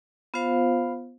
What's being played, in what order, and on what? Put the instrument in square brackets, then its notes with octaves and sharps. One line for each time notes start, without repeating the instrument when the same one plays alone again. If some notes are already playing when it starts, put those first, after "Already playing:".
[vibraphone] B3 F4 C5 F5